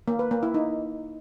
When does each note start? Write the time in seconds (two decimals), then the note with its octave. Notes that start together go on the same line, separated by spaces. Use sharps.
0.08 A#3
0.19 B4
0.31 A#3
0.43 E4
0.54 D#4